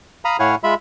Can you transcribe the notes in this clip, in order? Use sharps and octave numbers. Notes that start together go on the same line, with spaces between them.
F5 A#5 B5 D#6
A2 E4 C#5 F5 F#5 G#5
G#3 F4 E5 B5